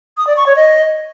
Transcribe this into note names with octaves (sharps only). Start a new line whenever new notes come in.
D#6
D5
C#6
C#5
D#5